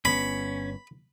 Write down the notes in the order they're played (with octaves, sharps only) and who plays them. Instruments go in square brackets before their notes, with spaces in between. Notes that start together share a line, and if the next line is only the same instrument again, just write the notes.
[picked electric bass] G1 B3 [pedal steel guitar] C#4 [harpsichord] B5